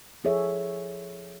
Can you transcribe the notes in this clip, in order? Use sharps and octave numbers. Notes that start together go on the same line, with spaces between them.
F3 E4 G#4 A4 C#5 E5